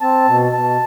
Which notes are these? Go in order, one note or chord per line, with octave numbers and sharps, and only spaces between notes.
C4 A5
B2
B2 A5